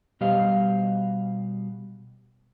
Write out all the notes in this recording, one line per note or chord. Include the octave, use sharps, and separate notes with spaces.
B2 G3 G4 C5 D#5 F5